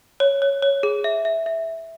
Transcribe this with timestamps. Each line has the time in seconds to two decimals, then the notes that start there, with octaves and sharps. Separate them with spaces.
0.20 C#5
0.42 C#5
0.62 C#5
0.83 G#4
1.04 E5
1.25 E5
1.46 E5